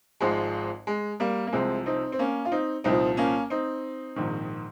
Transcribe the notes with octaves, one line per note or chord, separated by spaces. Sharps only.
G#1 G#2 F3 G#3
G#3
G3 A#3
A#3
C2 C3 F3 G#3 C4
C4 D#4
C4
A#3 C#4
F4
C4 D#4
C2 A#2 F3 C4 D#4
A#3 C#4
C4 D#4
A#1 G#2 D#3